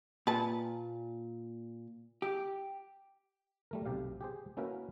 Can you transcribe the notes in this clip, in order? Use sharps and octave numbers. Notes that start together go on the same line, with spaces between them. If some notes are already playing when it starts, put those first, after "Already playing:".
A#2 B4 A5
G4
G3 A3 A#4
B1 C3 G4 F5
G4 G#4 C5
A#3 C#4 E4 F#4 A#4 B4